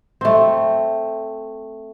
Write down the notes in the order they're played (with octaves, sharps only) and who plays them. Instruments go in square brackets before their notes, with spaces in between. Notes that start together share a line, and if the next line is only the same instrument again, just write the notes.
[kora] A3 C4